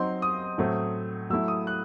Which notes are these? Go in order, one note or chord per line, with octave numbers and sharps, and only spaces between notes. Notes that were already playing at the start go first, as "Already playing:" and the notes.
Already playing: F#3 C4 D#4 C6
D#6
A2 F#3 A3 C4
F#3 A3 E4 E6
D#6
F#6